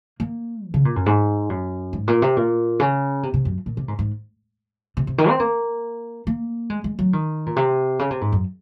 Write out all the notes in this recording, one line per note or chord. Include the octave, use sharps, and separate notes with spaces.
A#3
D#3
C#3
A#2
F#2
G#2
F#2
G#2
A#2
C3
A#2
C#3
C3
C3
F#2
A#2
C3
G#2
G#2
C3
C3
D#3
C4
A#3
A#3
G#3
G#3
F#3
D#3
A#2
C3
C#3
C3
G#2
F#2